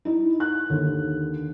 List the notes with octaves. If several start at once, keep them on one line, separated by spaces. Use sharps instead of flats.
D#4 E4
F#6
D#2 D3